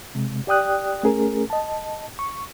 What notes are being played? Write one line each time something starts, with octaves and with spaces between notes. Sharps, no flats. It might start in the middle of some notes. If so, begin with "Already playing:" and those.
C3 G#3
G4 D5 G5 D#6 F#6
A3 C#4 G#4 A#4
D#5 A5
C#6